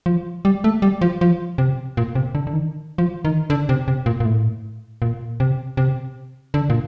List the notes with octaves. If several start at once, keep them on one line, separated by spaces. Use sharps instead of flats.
F3
G3
A3
G3
F3
F3
C3
A#2
C3
D3
D3
D#3
F3
D#3
D3
C3
C3
A#2
A#2
A2
A#2
C3
C3
D3
A#2